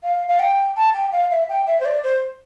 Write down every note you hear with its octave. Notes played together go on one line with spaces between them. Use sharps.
F5
F5
G5
A5
G5
F5
E5
G5
E5
C5
D5
C5